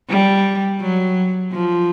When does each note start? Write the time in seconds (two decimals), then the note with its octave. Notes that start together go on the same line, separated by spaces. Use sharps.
0.09 G3
0.80 F#3
1.51 F3